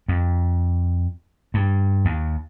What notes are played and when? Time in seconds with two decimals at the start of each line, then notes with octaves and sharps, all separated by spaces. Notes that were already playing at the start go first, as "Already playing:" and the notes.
0.08 F2
1.54 G2
2.05 D#2